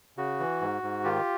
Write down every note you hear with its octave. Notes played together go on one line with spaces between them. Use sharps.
C#3 F#4
E3
G#2
G#2
D#3 F4 G4